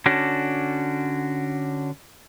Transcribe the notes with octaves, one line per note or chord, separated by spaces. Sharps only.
D3 C#4 D4 F#4